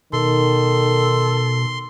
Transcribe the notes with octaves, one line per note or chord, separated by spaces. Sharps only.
B2 D#3 A4 C6